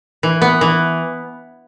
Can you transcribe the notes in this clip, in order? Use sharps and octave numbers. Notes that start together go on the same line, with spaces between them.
E3
B3
E3